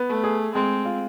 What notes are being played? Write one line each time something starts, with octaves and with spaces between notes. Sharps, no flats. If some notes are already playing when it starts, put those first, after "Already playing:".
Already playing: B3
A3
G#4
G#3 C4
F4